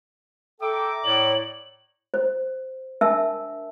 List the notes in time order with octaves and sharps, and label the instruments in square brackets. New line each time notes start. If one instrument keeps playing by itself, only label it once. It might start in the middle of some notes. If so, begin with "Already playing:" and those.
[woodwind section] A4 E5 G5 [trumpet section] A#5 D6
[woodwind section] A2 C#5 D5 [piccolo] F#7
[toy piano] C5
D4 A#4 E5 A5 E6